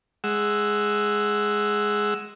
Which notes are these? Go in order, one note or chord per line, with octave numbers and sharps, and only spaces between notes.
G#3 F#5 E6